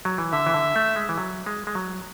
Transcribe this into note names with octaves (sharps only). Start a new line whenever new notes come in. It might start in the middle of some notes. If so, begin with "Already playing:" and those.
F#3
E3
D3 E5
E3
D3
A3
G#3
E3
F#3
G#3
G#3
F#3